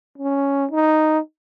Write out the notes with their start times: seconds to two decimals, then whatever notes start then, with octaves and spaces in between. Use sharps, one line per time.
0.18 C#4
0.71 D#4